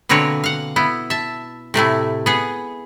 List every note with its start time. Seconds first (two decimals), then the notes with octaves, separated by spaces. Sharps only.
0.09 B2 D3 A#3 C4 B4 C#5
0.44 F5 F#5
0.76 B3 E4
1.10 E5 A5
1.74 A2 C3 A3 E4
2.26 B3 G#4